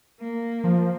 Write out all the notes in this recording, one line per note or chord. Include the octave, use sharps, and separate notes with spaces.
A#3
F3